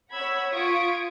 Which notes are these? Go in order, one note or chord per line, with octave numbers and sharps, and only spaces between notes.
C#5 F#5 B5 E6 G#6 B6
F4 C#6 D#6 G#6 B6 D7